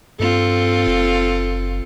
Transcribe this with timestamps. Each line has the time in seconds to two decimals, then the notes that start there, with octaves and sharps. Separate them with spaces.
0.20 G2 C4 F4 A4
0.87 F#1